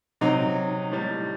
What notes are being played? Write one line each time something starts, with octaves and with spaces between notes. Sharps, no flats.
C3 F#3 D#4
A2 G3